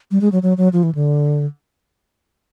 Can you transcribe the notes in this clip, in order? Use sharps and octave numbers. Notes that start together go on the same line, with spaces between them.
G3
G#3
F#3
F#3
F#3
F3
E3
D3